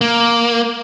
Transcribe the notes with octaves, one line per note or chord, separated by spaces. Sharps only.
A#3